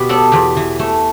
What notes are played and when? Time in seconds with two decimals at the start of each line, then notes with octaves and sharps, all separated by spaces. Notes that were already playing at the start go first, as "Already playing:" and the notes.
Already playing: B2 G4 B4
0.09 B3 A4 D5
0.32 E2 G4 B4
0.57 E3
0.79 A3